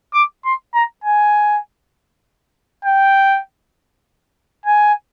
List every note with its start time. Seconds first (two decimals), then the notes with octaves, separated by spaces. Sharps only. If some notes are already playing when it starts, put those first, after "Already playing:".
0.14 D6
0.45 C6
0.74 A#5
1.04 G#5
2.85 G5
4.66 G#5